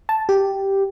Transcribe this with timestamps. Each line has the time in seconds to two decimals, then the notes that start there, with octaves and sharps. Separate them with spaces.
0.09 A5
0.29 G4